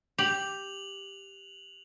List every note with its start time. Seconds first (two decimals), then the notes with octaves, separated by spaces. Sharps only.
0.18 G4 F7 F#7